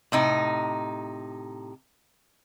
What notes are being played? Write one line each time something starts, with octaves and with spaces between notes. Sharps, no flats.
A2 C3 D#4